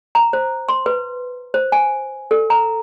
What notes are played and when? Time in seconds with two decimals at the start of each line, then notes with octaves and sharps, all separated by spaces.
0.15 A#5
0.33 C5
0.69 C6
0.86 B4
1.54 C5
1.72 G#5
2.31 A4
2.50 A#5